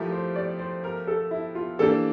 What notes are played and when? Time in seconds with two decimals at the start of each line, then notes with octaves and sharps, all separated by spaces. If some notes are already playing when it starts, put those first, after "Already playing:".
Already playing: F3 A3 E4 G4 A#4
0.12 C5
0.36 D5
0.59 C5
0.84 A#4
1.07 A4
1.31 E4
1.55 F4
1.79 E3 A#3 D4 G4 A4